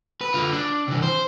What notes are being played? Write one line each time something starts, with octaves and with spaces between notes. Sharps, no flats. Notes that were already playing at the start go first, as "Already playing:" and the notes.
B4
D3 F4
D4
C3 E3
C5